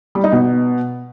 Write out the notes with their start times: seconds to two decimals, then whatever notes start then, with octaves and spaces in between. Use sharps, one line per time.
0.15 G3
0.24 D#4
0.32 B2